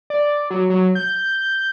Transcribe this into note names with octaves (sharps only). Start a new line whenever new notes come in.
D5
F#3
F#3
G6